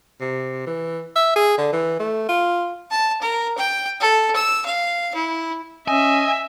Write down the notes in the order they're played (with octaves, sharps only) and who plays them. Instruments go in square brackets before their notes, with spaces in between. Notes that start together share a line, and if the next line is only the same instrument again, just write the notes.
[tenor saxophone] C3
E3
E5
G#4
D3
E3
A3
F4
[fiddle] A5
A#4
G5
A4
E6
F5
E4
[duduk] C#4 [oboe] D#5 [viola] E5 [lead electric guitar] G#5